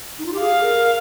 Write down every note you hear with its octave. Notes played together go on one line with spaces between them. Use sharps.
D#4
F4
G4
G#4 F5
A#4